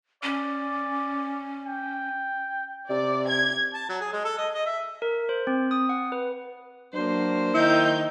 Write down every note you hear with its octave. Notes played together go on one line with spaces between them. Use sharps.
C#4 D5
G5
C3 D5
G#6
A5
F#3
G#4
G#3
A4
D#5
D#5
E5
A#4
C5
C4
D#6
F#5
B4
F#3 A#3 D4 C5
D#3 D#4 E4 G6